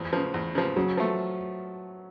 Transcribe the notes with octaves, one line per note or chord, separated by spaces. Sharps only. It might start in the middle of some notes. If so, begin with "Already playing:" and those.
Already playing: E2 F3
C#3 F3
E2
C#3 F3
C#3 F#3
F3 A3